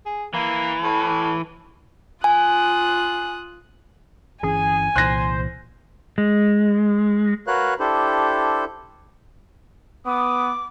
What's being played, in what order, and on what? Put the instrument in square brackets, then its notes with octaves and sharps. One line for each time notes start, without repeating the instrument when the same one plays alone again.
[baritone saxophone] G#4
[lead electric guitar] E3 [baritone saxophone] A#3
[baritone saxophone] A2
[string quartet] F4 D#6 F#6 [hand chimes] G#5
[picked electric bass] G1 E3 C#4 [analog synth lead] G#4 [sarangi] G#5
[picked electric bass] C2 A#2 E3 [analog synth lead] C5 [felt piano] F#6 A#6
[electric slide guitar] G#3
[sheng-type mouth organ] F#4 A#4 B4 C#5 F5 F#6
D4 E4 G4 A4 C5
[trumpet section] B3 D#6 [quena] D6